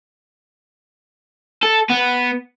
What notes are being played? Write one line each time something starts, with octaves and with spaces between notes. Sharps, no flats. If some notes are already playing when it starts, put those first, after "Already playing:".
A4
B3